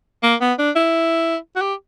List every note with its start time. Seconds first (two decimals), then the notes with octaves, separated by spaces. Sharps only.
0.23 A#3
0.41 B3
0.58 D4
0.76 E4
1.56 F#4
1.62 G4